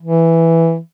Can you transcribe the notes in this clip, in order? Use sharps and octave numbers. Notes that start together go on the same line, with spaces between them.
E3